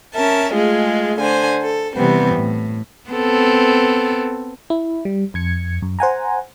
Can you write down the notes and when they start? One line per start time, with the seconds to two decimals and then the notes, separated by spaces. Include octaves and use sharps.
0.15 C#4 A#4 E5 A5
0.52 G#3 A3 F4 G#4
1.20 D3 C5 G#5
1.61 A4
1.95 C3 E3 G3 B3 C4
2.34 A2
3.10 B3 C4 A4
4.70 E4
5.05 G3
5.34 F2 G#6 C#7
5.82 F#2
5.99 C5 F#5 G#5 A#5